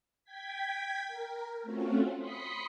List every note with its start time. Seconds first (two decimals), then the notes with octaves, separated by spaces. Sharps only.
0.24 G5 G#6 B6
1.07 A#4
1.62 A3 C4 C#4 F4 F#4
2.19 B5 C6 D#6 B6 C#7